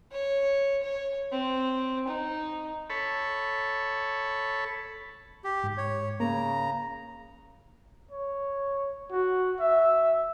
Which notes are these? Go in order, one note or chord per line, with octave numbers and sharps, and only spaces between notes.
C#5
C#5
C4
D#4
A4 C#5 B5
G4
G#2
C#5
C#3 A#3 A#5
C#5
F#4
E5